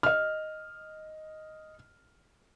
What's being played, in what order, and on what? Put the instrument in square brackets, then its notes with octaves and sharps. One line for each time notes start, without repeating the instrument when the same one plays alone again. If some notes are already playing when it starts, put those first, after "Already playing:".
[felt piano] D#5 F6